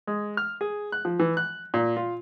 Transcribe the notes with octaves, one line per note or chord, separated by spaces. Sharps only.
G#3
F6
G#4
F#6
F3
E3
F#6
A#2
F4